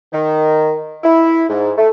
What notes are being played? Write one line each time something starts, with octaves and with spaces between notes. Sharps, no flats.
D#3
E4
G#2
A3